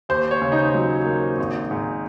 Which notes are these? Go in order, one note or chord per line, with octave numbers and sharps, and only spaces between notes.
D#2 C5
C#5
C#3
D#4
F#3
A#3
G#1
G#2